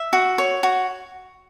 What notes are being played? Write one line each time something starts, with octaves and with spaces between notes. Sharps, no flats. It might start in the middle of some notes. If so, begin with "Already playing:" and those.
Already playing: E5
F#4
C#5
F#4